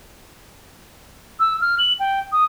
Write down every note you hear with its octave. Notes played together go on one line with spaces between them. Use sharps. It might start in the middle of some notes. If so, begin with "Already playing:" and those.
E6
F6
F#7
G5
D#6